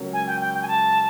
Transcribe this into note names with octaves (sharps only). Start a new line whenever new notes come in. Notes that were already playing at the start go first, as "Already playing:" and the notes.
Already playing: C#2 C#3 F#3 A#3
G#5
G5
G5
G5
G#5
A5